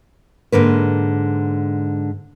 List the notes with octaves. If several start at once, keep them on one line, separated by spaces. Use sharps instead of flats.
G#2 D3 A#3 B4